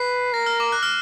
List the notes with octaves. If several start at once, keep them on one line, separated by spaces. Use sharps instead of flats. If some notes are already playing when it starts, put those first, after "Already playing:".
Already playing: B4 C7
A#4 A#6
F6
D6
F#6
F6